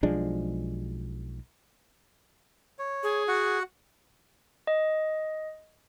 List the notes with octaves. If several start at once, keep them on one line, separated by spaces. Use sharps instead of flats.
B1 F3 G#3 D4
C#5
G#4
F#4 F#5
D#5